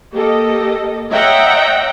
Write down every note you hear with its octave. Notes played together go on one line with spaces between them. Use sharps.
A#3 G4 A4 D#5
C#5 D#5 E5 F#5 G5 A#5